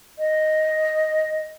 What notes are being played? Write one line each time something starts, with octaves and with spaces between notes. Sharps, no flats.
D#5